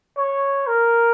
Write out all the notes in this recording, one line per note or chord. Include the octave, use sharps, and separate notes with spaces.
C#5
A#4